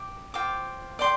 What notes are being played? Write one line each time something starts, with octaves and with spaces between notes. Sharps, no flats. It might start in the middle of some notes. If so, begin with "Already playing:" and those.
Already playing: G5 D6
F4 C5 G5 D6
D5 G5 C6